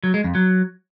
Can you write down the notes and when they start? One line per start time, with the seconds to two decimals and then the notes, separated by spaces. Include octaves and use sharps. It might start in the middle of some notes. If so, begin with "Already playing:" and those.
0.04 F#3
0.14 G#3
0.24 F2
0.35 F#3